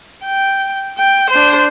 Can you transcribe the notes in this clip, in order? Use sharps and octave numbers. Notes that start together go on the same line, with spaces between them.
G5
G5
D4 C5